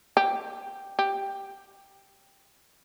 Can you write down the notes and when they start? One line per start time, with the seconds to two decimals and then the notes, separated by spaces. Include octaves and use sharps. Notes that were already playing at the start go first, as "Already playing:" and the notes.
0.17 G4
0.99 G4